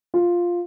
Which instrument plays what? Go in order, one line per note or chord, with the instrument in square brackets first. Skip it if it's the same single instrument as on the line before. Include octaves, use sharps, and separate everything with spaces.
[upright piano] F4